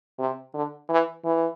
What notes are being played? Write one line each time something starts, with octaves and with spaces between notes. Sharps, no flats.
C3
D3
E3
E3